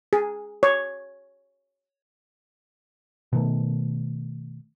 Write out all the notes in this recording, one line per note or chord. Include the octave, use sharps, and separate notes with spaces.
G#4
C#5
B2 D#3 A3